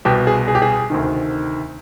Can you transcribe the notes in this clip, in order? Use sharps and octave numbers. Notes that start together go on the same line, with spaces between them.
C2 B2 G4
G#4
G#4
G4
G#4
D2 C3 D#3